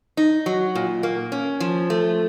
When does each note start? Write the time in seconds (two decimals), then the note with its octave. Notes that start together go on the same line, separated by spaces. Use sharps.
0.17 D#4
0.46 F#3
0.75 A#2
1.03 A#3
1.32 C#4
1.60 F3
1.90 A3